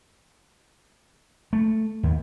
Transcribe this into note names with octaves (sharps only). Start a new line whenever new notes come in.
A3
D#2